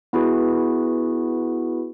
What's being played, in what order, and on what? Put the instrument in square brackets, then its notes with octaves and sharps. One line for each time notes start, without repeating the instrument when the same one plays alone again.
[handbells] B3 E4 F#4 G#4 B4